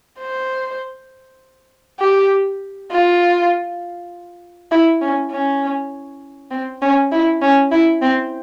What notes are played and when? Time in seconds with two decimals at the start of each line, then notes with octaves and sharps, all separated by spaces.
0.20 C5
1.99 G4
2.91 F4
4.71 E4
5.01 C#4
5.31 C#4
6.51 C4
6.82 C#4
7.12 E4
7.42 C#4
7.71 E4
8.02 C4